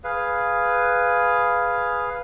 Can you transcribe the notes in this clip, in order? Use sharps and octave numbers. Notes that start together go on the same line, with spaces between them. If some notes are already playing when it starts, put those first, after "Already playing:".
G#4 B4 F5